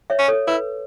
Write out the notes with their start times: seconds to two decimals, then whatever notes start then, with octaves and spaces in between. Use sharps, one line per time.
0.10 C#5 E5
0.19 C#4
0.28 A4 C#5
0.48 E4 B4